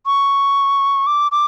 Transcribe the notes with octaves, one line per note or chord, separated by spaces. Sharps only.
C#6
D6
D6